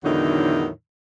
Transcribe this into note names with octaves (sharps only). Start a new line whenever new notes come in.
E2 A2 D3 D#3 F#3 D#4